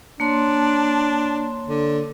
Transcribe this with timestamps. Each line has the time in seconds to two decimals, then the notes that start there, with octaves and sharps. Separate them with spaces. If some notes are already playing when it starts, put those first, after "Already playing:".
0.20 A#3 D4 C#5 C6
1.67 D3